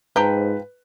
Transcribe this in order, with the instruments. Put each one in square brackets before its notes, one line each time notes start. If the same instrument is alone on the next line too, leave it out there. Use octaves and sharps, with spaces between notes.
[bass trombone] G#2 [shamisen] F3 G5 A#5 [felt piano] B4